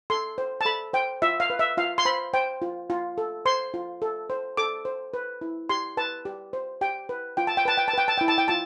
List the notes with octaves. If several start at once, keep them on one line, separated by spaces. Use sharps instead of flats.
A4 C6
C5
A5
A4 B5
C5 G5
F4 E5
F5
B4
E5
F4 F5
C6
C5 B5
C5 G5
F4
F4
A4
C5 C6
F4
A4
C5
A4 D6
C5
B4
E4
G4 C6
B4 A5
G4
C5
G4 G5
B4
F4 G5
A5
G5
B4 A5
G5
A5
B4 G5
A5
E4 G5
A5
G5
F4 A5